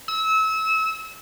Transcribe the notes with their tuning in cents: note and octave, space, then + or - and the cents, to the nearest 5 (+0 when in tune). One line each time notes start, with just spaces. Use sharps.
E6 -30